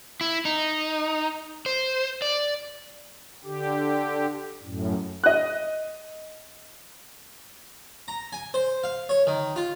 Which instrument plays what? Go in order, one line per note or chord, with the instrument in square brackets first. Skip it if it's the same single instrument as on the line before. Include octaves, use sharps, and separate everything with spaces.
[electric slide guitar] E4
D#4
C5
D5
[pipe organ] D3 G4
F#2 A2
[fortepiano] D#5 F#6
[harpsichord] A#5
G#5
C5
F5
C#5
D#3
F4